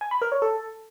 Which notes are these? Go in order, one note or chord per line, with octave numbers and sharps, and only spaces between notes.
G#5
B5
A#4
C#5
A4